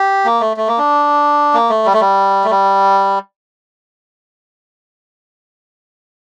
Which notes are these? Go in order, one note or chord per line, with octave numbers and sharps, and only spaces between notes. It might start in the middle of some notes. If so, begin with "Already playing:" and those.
Already playing: G4
A#3
A3
A3
A#3
D4
A#3
A3
G3
A3
G3
A3
G3